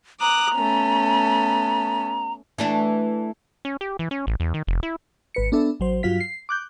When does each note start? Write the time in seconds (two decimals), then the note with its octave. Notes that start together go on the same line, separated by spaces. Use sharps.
0.21 A#5 D6 D#6 F#6
0.57 A3 B3 C#4
2.58 E3 A3 D4
3.65 C#4
3.81 G4
3.99 E3
4.11 C#4
4.27 A1
4.40 E2
4.54 D#3
4.67 F1
4.83 E4
5.35 G#1 B4 C#7
5.52 B3 D4 A4 E5
5.80 A1 F#3 C5
6.03 G2 F#3 F4 F5 B6
6.20 C7
6.49 D6 F#6 G6